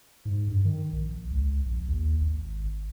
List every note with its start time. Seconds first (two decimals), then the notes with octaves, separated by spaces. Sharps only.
0.25 G#2
0.48 G2
0.65 D#3
0.93 A#1
1.31 C#2
1.66 A#1
1.88 D#2
2.21 G#1